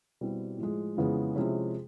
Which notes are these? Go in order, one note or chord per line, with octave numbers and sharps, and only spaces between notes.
B2 G3 C4 E4 G4
A2 F3 G#3
F2 C#3 E3 G#3 B3
C3 F3 G#3 C#4 E4